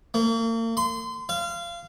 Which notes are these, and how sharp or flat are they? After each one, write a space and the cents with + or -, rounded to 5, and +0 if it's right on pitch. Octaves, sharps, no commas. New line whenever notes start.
A#3 -40
C6 -30
F5 -25